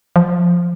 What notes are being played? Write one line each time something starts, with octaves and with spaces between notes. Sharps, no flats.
F3